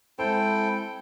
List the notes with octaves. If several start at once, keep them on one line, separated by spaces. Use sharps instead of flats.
G#3 C4 E4 A4 C5 G5